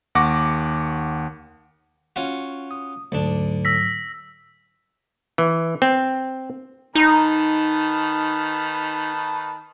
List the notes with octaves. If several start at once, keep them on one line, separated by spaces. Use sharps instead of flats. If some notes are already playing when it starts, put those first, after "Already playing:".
D#2 F#5 C#6 D6 A#6
C#4 F4 F#4
D#6
D2 G#2 F#3 D4
E6 A#6 B6
E3
C4
D#3 D#4 B4 A5